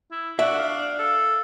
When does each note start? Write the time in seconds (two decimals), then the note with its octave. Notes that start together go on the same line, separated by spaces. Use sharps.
0.11 E4
0.39 D4 F#4 E5
0.59 F5
0.99 A4